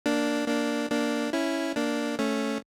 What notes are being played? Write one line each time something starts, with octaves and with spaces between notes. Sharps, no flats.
A#3 D4
A#3 D4
A#3 D4
C#4 E4
A#3 D4
A3 C#4